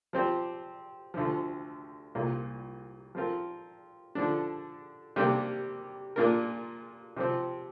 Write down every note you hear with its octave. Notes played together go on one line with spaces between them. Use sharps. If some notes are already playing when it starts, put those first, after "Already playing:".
F3 C4 G4 C5
D2 D3 F3
C2 A#2 A#3
F3 C4 F4 A#4
D3 F3 D4
C3 G3 A#3 D4 G4
A#2 A#3 D4 F4 A#4
C3 F3 C4